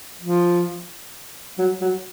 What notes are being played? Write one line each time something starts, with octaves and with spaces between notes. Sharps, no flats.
F3
F#3
F#3